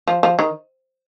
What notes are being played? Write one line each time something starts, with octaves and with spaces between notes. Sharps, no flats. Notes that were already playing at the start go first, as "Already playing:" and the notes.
F3
F3
D#3